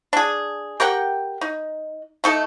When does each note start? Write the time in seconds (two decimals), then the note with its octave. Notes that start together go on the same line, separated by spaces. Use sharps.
0.13 D4 G#4
0.80 G4 A#4 F#5 G5
1.41 D#4
2.24 A3 D#4 A4